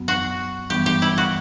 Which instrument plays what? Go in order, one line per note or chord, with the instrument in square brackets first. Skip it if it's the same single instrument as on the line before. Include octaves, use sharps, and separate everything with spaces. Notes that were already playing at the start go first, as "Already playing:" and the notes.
Already playing: [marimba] F#2 F#3 B3
[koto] F#4
[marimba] G2 E3 G3 B3 [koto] G4
[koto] G4
E4
F#4